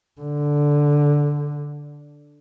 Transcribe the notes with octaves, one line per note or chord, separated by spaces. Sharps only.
D3